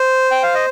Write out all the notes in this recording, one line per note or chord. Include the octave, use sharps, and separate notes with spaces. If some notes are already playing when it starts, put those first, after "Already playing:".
Already playing: C5
G5
F5
D#5